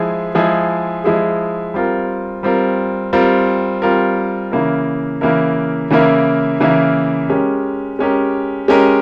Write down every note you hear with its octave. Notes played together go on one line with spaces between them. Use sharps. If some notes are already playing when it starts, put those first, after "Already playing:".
Already playing: F3 G#3 E4 G#4
F3 G#3 E4 G#4
F3 G#3 E4 G#4
G3 C4 F4 A#4
G3 C4 F4 A#4
G3 C4 F4 A#4
G3 C4 F4 A#4
C#3 E3 A#3 E4 A#4
C#3 E3 A#3 E4 A#4
C#3 E3 A#3 E4 A#4
C#3 E3 A#3 E4 A#4
G#3 C#4 G4 A#4
G#3 C#4 G4 A#4
G#3 C#4 G4 A#4